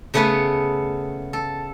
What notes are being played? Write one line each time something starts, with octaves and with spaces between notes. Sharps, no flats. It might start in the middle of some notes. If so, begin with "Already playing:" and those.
C#3 A3 B3 G#4 B4 C#5
A4